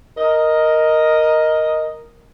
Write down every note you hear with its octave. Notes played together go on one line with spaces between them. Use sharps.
A#4 D#5